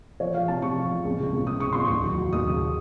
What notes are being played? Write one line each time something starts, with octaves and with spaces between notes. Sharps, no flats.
F3 C#5
F3 F5
C3 A5
C3 C#6
F3
F3
C#2
C#3
C#2
C#3 D#6
C#3 C#6
C#2 C6
D#2 C#6
F#3
F#3
D#2 D#6
C#3